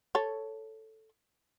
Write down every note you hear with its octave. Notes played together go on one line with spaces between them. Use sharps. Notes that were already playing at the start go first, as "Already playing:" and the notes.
A4 C#5